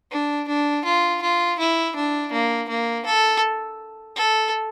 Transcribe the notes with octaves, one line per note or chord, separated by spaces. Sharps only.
D4
D4
F4
F4
E4
D4
A#3
A#3
A4
A4